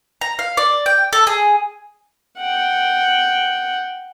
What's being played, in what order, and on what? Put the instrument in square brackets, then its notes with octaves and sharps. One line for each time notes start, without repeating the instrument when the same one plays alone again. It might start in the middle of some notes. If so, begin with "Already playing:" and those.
[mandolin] A#5
F5
D5
G5
A4
G#4
[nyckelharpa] F#5 G5